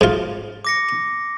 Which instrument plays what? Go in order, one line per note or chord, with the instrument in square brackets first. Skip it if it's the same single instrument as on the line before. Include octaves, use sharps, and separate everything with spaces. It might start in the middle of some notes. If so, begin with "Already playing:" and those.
[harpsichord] G#2 F4
[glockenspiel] D6 A#6 C#7